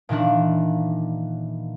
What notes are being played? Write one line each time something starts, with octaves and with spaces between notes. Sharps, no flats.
A#2 D#3 E3 D4